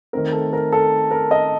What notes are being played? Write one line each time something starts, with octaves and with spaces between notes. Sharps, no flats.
D#3 A3 C4 A#4
A4
A#4
A4
A#4
D#5